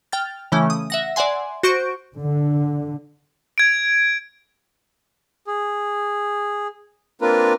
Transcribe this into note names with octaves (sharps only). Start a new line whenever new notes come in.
G5 F6 A6
C#3 E3 A3 C#4
D#6
E5 F#5 A#6
D5 E5 F#5 G#5 C6
F#4 C5 C#6 G6 D7
D3
G#6 D7
G#4
A#3 C4 D4 F4 A#4 B4